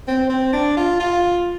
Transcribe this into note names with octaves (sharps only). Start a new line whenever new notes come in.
C4
C4
D4
F4
F4